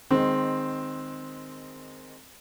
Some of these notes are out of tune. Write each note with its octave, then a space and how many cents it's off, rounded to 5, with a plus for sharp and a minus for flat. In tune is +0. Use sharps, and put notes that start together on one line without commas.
D#3 -10 G#3 +0 C4 +0